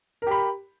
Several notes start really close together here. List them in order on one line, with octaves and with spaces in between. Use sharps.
A#4 G4 B5